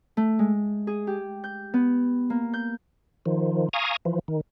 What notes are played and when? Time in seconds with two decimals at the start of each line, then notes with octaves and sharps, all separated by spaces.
0.17 A3
0.39 G#3
0.87 G#4
1.07 G4
1.44 G6
1.74 B3
2.30 A#3
2.54 G6
3.26 D#3 F3
3.73 F5 G#5 A#5 C#6 D#6
4.05 E3 F3
4.28 D#3